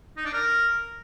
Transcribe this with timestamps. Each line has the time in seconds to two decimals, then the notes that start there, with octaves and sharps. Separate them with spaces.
0.17 D#4
0.25 D4
0.33 A#4